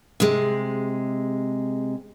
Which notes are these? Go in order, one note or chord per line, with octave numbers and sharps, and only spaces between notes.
C3 G#3